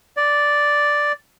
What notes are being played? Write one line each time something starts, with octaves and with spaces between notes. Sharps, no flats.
D5